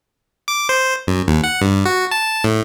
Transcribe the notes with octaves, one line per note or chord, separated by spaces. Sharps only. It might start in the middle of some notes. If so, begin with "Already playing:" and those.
D6
C5
F#2
D#2
F#5
G2
F#4
A5
A2